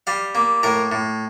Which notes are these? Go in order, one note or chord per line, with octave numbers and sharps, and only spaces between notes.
G3 F5
A#3
A2 A#4
A2